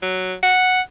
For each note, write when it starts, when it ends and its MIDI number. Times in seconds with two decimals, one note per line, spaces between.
0.02 0.34 54
0.43 0.81 78